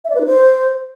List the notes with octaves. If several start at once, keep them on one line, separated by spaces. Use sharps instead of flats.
E5
D5
B4
D#4
C5